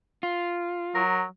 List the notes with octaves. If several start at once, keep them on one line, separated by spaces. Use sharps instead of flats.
F4
F#3 A#4